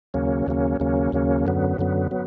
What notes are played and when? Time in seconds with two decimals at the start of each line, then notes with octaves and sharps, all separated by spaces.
0.14 D#2 C#3 F#3 A#3 C#4
0.47 D#2 C#3 F#3 A#3 C#4
0.80 D#2 C#3 F#3 A#3 C#4
1.12 D#2 C#3 F#3 A#3 C#4
1.46 F#2 D3 F#3 B3
1.78 F#2 D3 F#3 B3
2.11 F#3 B3